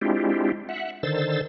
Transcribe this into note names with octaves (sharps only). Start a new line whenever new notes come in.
G#3 C4 D4 E4 F4 G4
E5 F#5
D3 D#3 C5 E6 A6